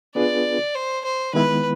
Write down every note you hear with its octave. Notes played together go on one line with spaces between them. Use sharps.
B3 D4 F4 G#4 B4 D5
C5
C5
D#3 G#3 B3 E4 B4